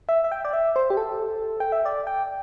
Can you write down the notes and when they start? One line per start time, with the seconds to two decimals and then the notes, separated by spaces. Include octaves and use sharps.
0.09 E5
0.24 E5
0.32 G5
0.45 D5
0.53 E5
0.76 C5
0.90 G4
0.97 A4
1.60 G5
1.72 E5
1.85 D5
2.07 G5